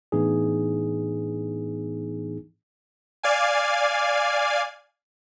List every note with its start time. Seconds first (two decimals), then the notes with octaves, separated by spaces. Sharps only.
0.12 A2 E3 B3 D4 D#4 G#4
3.24 D5 F5 G#5